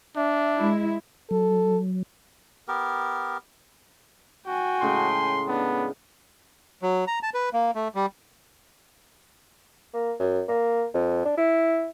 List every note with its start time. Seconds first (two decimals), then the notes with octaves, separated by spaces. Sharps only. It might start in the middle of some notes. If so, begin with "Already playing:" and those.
0.16 D4 E5
0.56 G#3 E4
1.31 F#3 A4
2.68 B3 G4 A#4
4.47 F#4 G5 G#5
4.82 A2 C#3 G#3 C6
5.48 B3 D4
6.82 F#3
7.07 A#5
7.23 A5
7.34 B4
7.53 A#3
7.75 A3
7.95 G3
9.94 A#3
10.20 F#2
10.48 A#3
10.94 F2
11.25 D4
11.37 E4